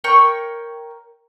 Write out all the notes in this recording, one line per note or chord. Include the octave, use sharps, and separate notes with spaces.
A#4 C#5 G5 C#6